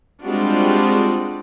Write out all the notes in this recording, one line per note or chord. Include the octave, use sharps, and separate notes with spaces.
G3 G#3 C4 D4 F4 F#4